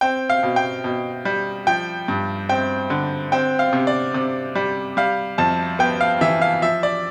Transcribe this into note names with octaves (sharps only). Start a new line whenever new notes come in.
C4 G5
F5
B2
G5
B2
G3
F3 G5
G2
C4 G5
D3
C4 G5
F5
C3
D5
C3
G3
G3 F5
F2 A5
B3 G5
F5
E3 E5
F5
F3 E5
D5